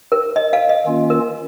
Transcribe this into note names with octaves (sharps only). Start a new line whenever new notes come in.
A#4
D#5
F5
D#5
D#3 A#3 C#4 F4
A#4